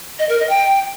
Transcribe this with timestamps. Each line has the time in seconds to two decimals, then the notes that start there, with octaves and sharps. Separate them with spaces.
0.19 D#5
0.29 A#4
0.39 D#5
0.49 G5